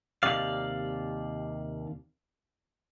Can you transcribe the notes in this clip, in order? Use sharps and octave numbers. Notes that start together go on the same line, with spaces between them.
D#2 C3 D5 F5